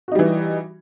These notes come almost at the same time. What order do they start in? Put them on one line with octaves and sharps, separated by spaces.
F#4 D#4 G3 E3